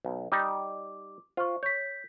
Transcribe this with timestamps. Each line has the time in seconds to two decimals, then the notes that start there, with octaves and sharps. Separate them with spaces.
0.05 B1
0.32 G3 D#4 D6
1.37 F4 C5 C#6
1.63 C#5 G6 B6